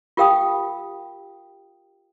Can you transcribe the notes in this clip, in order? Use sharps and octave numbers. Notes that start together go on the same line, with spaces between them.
F4 G4 A#4 F5 G5 D#6